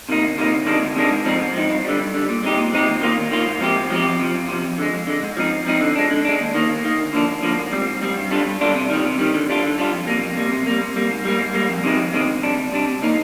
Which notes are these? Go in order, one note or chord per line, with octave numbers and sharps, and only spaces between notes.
C3 D#3 A#3 D#4
D2
C3 D#3 A#3 D#4
D2
C3 D#3 G#3 D4
D2
C3 D#3 G#3 D4
G#2
F3 C4 D#4
G#2
F3 C4 D#4
G2
D3 G3
G2
D3 G3
A#2
G#3 C4 D#4 G4
A#2
G#3 C4 D#4 G4
D#2
D#3 A#3 F4
D#2
D#3 A#3 F4
G#2
F3 C4 G4
G#2
F3 C4 G4
F2
C3 F3
F2
C3 F3
F2
D3 G#3
F2
D3 G#3
G#2
F3 C4 D#4
G#2
F3 C4 D#4
D3
G#3 D4
D3
G#3 D4
D#2
D#3 A#3
D#2
D#3 A#3
D2
D3 F3 A#3 D4
D2
D3 F3 A#3 D4
G#2
G3 C4
G#2
G3 C4
G2
D3 G3 D4 F4
G2
D3 G3 D4 F4
C3
D#3 G3
C3
D#3 G3
D3
G3 D4 F4
D3
G3 D4 F4
F2
C3 G3 A#3
F2
C3 G3 A#3
C3
G3 A#3
C3
G3 A#3
G#2
G3 A#3
G#2
G3 A#3
F2
C3 D#3 G#3 C4
F2
C3 D#3 G#3 C4
D2
C3 G3 D4
D2
C3 G3 D4
C3
D#3 A#3 D#4